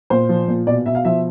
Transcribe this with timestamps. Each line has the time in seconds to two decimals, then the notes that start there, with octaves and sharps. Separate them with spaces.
0.10 A#2 C5
0.29 F3
0.48 A#2
0.67 B2 D5
0.86 B2 E5
0.95 F5
1.05 F3 E5